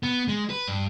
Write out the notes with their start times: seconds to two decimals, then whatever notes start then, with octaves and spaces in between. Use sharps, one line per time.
0.03 B3
0.28 G#3
0.50 B4
0.67 G2